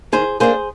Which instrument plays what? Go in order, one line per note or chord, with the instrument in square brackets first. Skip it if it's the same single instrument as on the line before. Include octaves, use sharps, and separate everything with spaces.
[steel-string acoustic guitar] D#3 [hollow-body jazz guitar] G#4 C5
[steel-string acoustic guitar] A#3 D4 [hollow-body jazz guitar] G#4 C5